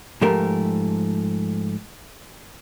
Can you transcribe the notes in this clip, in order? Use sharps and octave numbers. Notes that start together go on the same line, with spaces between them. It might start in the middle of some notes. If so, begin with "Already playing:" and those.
G#2 F3 A3 G4 A#4